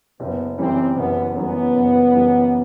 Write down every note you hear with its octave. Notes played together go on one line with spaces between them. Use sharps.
F#1 B3
F#2 E3 G3 C4
F#1 B3
F#2 E3 G3 B3
F#1
F#2 E3 G3